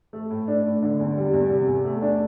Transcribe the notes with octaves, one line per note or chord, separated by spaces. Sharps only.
A3
A2
D4
A2
D3
E2
G3
E2
C3
E2
A3
D4